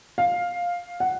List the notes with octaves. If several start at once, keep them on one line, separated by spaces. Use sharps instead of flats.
F5
F#5